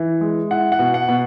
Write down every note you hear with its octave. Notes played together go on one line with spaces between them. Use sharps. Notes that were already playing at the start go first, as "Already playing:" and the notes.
Already playing: E3
G#3
E4 F#5
F#5
B2
F#5
B2